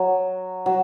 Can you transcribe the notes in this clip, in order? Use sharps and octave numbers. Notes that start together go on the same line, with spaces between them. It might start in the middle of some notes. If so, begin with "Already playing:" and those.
Already playing: F#3
F#3